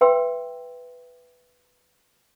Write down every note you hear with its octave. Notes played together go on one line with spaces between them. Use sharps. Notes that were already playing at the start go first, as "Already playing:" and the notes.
B4 E5 G5 C6 E6